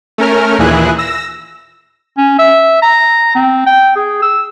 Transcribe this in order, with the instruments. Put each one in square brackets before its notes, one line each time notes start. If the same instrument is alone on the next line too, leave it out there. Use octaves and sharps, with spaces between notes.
[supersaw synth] A3 C#4 A#4 F6
D#2 A#2 E3 E4 G#4 F#6
E6 A#6
[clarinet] C#4
E5
A#5
C4
G5
G#4
E6